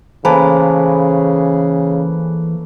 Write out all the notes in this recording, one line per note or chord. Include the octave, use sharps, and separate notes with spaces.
C#3 E3 A3 A#3 B4 C5 G#5 A5